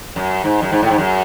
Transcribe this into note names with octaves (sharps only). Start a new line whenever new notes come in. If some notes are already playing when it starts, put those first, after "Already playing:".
F#2
G#2
F#2
G#2
A2
G#2
F#2